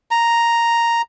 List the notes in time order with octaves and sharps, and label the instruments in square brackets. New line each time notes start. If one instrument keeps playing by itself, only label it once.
[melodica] A#5